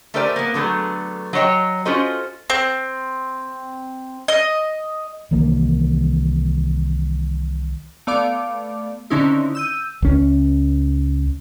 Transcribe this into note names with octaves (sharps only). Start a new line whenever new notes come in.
A3 G4 A#4 C5 D5 G#5
A#3 B3
D3 F#3 A3 B3 G#4
F#3 A4 C#5 D#5 G5
C#4 F4 F#4 A4 C5 D#5
C4
D#5
C2 D#3 E3 A#3
A3 B3 D5 F5 D6
D3 D#3 C4 C#4 D#4 E4
E6 G6 D#7
C#2 C#4